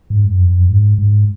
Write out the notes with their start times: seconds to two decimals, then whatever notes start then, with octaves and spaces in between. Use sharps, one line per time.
0.10 G#2
0.25 F#2
0.39 F2
0.50 F#2
0.60 F2
0.69 G#2
0.98 G#2